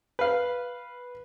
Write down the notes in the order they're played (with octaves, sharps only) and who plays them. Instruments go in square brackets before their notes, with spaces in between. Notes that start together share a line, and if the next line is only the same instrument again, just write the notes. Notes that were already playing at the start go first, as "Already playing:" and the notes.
[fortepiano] B4 F5